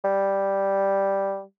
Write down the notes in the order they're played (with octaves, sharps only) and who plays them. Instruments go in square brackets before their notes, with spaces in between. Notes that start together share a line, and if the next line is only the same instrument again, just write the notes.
[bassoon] G3